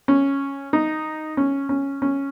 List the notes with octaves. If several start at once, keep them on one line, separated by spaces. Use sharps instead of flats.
C#4
D#4
C#4
C#4
C#4